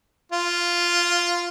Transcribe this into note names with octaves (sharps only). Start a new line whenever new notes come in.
F4